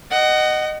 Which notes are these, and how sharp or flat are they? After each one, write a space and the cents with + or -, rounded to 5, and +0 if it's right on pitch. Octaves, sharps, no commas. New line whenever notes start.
D#5 -15 F#5 +20